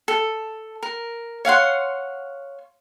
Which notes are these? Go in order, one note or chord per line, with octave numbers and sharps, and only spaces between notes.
A4
A#4
C#5 F5 F#5 C6